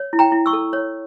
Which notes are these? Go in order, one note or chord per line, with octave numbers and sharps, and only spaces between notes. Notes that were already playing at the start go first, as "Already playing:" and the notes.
Already playing: C#5
E4
G5 A#5
E4
C#6 E6
A4
C#5